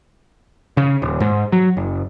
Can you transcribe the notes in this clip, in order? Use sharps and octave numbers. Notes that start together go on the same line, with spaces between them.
C#3
D#1
G#2
F#3
F#1